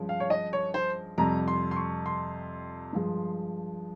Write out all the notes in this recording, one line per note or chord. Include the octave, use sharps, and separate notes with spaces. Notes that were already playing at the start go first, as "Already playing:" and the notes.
Already playing: G2 F3 G#3 C#4
F5
C#5
D#5
C#5
C5
F2 C3 G3 A#5
C6
C6
C#6
C6
G2 F3 G#3